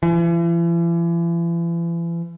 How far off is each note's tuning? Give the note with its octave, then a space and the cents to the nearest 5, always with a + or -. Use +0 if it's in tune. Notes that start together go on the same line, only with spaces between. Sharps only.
E3 +40